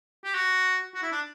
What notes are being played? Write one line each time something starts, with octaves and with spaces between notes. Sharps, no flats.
G4
F#4
F#4
E4
D4